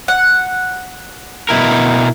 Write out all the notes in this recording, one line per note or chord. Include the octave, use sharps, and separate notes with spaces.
F#5
B2 E4 A#4